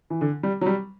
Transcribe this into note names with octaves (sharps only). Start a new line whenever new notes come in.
E3
D3
G3
F#3
G3